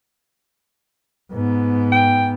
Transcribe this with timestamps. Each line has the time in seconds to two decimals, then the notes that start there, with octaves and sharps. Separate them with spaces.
1.33 G#2 B3
1.92 G5